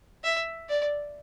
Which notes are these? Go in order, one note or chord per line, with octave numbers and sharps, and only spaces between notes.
E5
D5